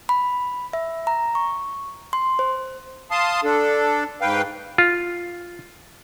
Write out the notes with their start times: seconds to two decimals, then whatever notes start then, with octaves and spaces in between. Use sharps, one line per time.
0.09 B5
0.73 E5
1.07 A#5
1.35 C#6
2.13 C6
2.39 C5
3.11 F5 A5 C6 D#6
3.44 D4 A4
4.21 G#2 B4 F5 G5
4.78 F4